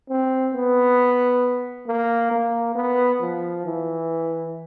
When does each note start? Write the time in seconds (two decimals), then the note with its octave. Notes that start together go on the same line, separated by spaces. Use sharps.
0.09 C4
0.54 B3
1.87 A#3
2.31 A#3
2.75 B3
3.21 F3
3.65 E3